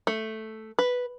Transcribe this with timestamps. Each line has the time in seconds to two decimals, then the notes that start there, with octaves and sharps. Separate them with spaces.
0.07 A3
0.79 B4